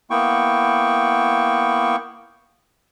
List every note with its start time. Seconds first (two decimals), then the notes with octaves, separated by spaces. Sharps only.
0.10 A#3 B3 E4 G5 C#6